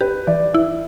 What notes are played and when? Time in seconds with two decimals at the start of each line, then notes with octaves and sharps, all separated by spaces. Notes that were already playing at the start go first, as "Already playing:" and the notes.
0.01 G4 B4
0.27 E3 D5
0.53 E4 E5